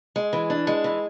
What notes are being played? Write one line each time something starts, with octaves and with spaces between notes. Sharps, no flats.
G#3
E3
D4
G#3
E3